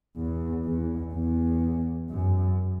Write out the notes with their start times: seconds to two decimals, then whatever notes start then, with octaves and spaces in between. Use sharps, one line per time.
0.16 E2
0.65 E2
1.14 E2
2.10 F#2